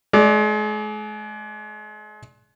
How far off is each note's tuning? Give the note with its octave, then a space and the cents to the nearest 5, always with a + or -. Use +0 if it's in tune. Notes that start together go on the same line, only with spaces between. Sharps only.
G#3 +40 D5 +0